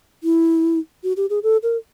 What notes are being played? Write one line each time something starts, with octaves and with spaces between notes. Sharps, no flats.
E4
F#4
G4
G#4
A4
A#4